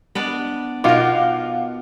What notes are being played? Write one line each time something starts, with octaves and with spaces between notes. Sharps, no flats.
B3 D4 D5
B2 D#4 F4 A#4 F5 F#5 D6